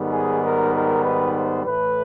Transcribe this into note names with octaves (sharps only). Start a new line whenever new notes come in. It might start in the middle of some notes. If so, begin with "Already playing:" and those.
Already playing: G#2 D#3 G3 B3
G#4
A#4
A#4
B4
C5
A2 E3 A3 B4